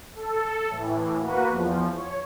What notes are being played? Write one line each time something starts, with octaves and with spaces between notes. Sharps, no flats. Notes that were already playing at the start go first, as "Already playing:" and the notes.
A4
A2 E3
A#3 F#4 B4
E2 F3
C#5